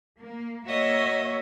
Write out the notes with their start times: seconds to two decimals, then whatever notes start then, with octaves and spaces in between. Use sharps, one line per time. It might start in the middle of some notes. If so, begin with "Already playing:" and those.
0.18 A#3
0.66 A#3 F#4 C#5 D#5 E5